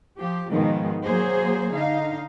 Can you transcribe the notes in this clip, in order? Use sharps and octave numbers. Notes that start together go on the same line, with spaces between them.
F3 G4
G#2 B2 D#3 F3 G#3
F#3 A#3 G#4 C5
D3 D#4 F5